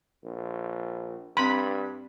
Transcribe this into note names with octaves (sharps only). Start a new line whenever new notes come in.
A#1
G2 C4 B5 C6